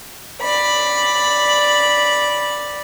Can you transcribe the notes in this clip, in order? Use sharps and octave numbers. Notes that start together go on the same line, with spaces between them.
D5 B5